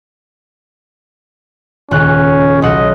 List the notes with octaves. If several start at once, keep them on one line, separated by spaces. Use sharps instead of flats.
D#1 C#2 C#4 F#6
B1 D#5 F#5 E6